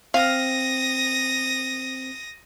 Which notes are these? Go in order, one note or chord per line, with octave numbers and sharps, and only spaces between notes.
C4 F5 D#6 A#6